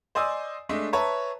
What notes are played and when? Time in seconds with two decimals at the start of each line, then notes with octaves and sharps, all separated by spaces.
0.15 C5 D5 D#5 G#5 D#6 E6
0.69 G#3 A3 D4 D#5 E5
0.93 B4 C#5 E5 A5 A#5